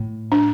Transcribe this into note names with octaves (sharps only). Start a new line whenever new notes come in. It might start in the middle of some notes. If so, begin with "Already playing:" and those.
Already playing: A2
D4